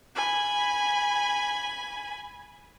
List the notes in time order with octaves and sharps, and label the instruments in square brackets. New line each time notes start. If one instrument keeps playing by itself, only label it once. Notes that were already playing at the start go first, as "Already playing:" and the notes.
[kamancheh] G#5 B5